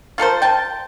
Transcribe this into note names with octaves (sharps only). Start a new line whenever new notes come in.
F4 A4 A#4 C5
G5 A5